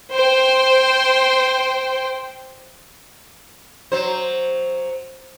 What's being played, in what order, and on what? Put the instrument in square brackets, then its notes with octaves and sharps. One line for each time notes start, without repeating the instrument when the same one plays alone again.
[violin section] C5 G5
[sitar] F#3 C5